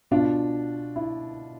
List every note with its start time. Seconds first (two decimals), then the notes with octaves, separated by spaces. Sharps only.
0.11 B2 D4 F4
0.96 E4